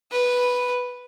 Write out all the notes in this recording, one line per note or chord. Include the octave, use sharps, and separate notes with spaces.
B4